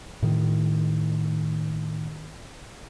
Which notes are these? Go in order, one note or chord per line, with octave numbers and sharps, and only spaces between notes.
A2 D#3